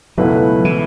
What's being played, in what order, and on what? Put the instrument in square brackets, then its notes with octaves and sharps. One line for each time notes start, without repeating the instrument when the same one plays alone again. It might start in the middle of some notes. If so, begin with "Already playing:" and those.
[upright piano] C#2 B2 A3 E4 B4 [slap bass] F#3
[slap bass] E3